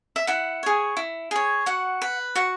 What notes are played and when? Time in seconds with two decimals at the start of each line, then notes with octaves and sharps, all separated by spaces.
0.16 E5
0.27 E4 F#5
0.63 G#4 C#5
0.97 E4
1.31 G#4 C#5
1.66 F#4 F#5
2.02 B4
2.35 F#4 F#5